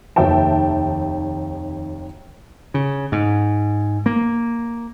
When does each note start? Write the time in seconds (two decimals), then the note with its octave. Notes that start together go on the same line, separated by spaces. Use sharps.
0.16 F1 D#2 E5 G5 A5
2.74 C#3
3.12 G#2
4.06 A#3